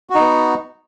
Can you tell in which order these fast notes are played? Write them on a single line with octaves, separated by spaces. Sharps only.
F#4 D#4 B3